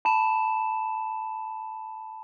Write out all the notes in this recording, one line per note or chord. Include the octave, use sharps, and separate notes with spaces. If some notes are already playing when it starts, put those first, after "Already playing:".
A5 B5 E7